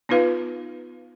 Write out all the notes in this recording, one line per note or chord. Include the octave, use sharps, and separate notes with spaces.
B3 D#4 F4 B4 F5